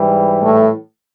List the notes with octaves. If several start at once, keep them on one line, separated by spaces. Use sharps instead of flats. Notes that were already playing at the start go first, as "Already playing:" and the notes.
Already playing: G#2 E3 G3
A2 A3